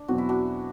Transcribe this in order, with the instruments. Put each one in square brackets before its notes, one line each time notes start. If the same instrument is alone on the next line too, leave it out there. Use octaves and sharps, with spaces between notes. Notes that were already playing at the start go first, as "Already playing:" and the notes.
Already playing: [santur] D4
[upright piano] E2 B2 F#3 C4 [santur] F#4
[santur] E4
D4 F#4